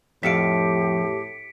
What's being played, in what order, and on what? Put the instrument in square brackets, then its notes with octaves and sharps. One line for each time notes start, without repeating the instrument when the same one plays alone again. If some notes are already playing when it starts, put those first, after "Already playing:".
[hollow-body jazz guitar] F2 E5 F5 [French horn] A2 [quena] G4 [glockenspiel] B6 C#7 D7